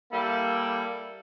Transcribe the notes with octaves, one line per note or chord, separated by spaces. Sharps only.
G3 A#3 E4 A4